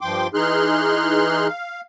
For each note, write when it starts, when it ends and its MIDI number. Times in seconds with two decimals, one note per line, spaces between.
0.01 0.27 43
0.01 0.27 53
0.01 0.27 79
0.01 0.27 84
0.01 0.27 86
0.34 1.47 52
0.34 1.47 63
0.34 1.47 68
0.34 1.47 84
0.34 1.47 89
0.34 1.47 90
1.48 1.81 77